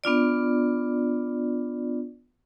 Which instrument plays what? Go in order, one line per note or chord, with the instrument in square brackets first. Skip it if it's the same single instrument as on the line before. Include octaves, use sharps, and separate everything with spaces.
[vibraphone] B3 D4 F4 D5